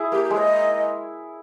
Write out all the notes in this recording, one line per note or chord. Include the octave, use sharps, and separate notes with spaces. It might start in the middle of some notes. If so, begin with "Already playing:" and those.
Already playing: E4 G#4
A#3 G4
G4
G#3
D#5